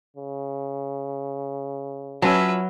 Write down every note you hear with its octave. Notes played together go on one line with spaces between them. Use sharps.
C#3
F#3 C#4 F4 B4 E5 A5